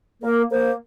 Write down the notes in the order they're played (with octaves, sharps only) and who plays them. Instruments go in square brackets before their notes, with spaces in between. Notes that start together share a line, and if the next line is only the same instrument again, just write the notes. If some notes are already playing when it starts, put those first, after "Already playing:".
[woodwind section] A#3 [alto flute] A#4
[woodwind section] A#3 [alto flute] C5